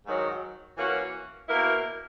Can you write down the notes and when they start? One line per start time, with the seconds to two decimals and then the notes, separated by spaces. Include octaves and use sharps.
0.06 G#2 D#3 F#3
0.76 E3 A#3 C#4 F#4
1.48 B2 A#3 E4 A#4